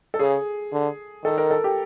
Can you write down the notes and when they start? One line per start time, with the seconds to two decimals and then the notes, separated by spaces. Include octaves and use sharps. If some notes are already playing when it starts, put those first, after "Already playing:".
0.14 A4
0.19 C#3 G#4
0.72 D3
1.24 D#3 A4
1.38 A#4
1.51 A4
1.64 G4